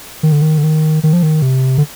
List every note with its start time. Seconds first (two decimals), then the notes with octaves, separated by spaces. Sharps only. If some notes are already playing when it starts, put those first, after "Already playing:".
0.23 D#3
0.32 D3
0.42 D#3
0.58 D3
0.64 D#3
1.03 D#3
1.13 F3
1.23 D#3
1.42 C3
1.78 D3